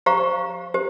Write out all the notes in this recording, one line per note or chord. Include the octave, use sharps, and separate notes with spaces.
G4 C5 F5 A#5 C#6
G4 C5